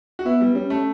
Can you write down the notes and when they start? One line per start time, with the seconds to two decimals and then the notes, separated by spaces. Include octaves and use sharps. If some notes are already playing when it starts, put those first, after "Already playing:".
0.19 F#4
0.25 B3 E4
0.41 G3
0.55 G3 C#4
0.70 A3